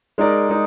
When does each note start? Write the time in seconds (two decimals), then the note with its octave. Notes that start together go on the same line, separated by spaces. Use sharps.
0.18 G#3 D#4 A#4 D5
0.49 G#3 D#4